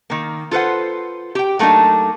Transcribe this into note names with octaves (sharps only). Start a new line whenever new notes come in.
D#3 A#3
F4 A4 B4 C5 F#5
G4 G5
F#3 A3 A#3 D4 D#4